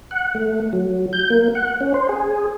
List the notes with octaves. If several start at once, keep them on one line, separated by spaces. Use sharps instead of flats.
F#5
A3
F#3
G6
A#3
F#5
C#4
C5
G#4